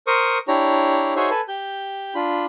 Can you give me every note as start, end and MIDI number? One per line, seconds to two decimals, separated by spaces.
0.07 0.38 70
0.07 0.38 72
0.07 0.38 85
0.07 0.38 87
0.48 1.14 62
0.48 1.14 64
0.48 1.14 67
0.48 1.14 73
0.48 1.14 82
1.16 1.30 63
1.16 1.30 66
1.16 1.30 68
1.16 1.30 72
1.16 1.30 73
1.16 1.30 76
1.30 1.41 69
1.30 1.41 71
1.30 1.41 80
1.48 2.14 67
1.48 2.14 91
2.15 2.46 62
2.15 2.46 65
2.15 2.46 83